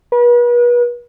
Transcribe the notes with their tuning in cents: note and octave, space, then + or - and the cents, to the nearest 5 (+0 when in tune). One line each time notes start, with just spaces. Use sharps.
B4 -40